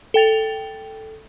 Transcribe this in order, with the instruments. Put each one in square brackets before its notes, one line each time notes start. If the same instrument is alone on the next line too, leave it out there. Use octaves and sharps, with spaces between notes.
[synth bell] A4 G5 A6 F7